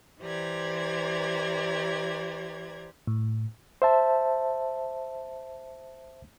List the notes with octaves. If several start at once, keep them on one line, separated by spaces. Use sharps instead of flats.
E3 G4 C5 D5 A#5 G#6
A2
C5 E5 A5